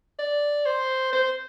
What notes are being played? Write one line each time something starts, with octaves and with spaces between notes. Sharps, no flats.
D5
C5
C5